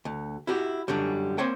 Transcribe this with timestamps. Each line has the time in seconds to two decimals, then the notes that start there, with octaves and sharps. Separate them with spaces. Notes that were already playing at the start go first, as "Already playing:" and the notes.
0.05 D2
0.47 E4 F#4 G4
0.88 F#2 D3 F#3 G3
1.38 A#3 C4 C5 C#5 G5